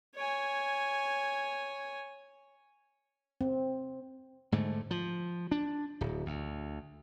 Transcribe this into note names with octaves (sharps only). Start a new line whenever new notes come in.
C#5 G#5
C4
G#2 D3 A3
F3
D4
D1
D2